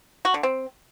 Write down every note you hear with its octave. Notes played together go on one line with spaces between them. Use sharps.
F#4
D3
C4